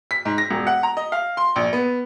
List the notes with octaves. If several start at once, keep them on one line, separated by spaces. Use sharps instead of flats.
B6
G#2
A#6
E1
F#5
A#5
D#5
F5
C6
A#1
B3